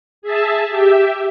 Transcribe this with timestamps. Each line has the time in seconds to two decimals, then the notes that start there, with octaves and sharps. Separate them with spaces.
0.22 G#4 E5 A5
0.70 G4 E5